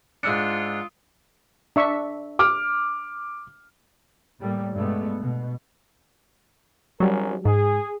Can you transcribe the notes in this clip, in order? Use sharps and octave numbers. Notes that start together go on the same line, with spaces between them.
G#2 D4 F4 D#6 E6 C#7
D4 E5 C#6
D6 F6
A2 G3 A3 A#3
G2 B2 G#3 A3 B3
B2
G#1 F#3 G3 C#4 A#4
G#2 G#4